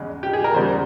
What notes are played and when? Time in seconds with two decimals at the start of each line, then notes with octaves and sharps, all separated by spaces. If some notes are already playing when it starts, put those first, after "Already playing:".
Already playing: E2 C#3 G#3
0.23 G4
0.33 G#4
0.44 A#4
0.54 E2 C#3 G3 C5